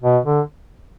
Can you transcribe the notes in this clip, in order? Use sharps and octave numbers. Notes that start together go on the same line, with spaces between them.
B2
D3